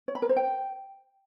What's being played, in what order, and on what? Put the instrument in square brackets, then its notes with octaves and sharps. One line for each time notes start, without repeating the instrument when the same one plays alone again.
[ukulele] C#5
B5
A#4
C5
G5